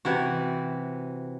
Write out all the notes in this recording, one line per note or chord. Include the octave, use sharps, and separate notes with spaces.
C3 E3 F#4